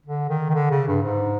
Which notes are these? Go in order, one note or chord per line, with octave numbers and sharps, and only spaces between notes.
D3
D#3
D#3
D3
C#3
G2
G#2